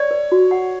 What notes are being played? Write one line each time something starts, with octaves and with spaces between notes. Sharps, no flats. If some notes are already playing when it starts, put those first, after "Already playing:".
Already playing: C#5 D5
B4
F#4
F#5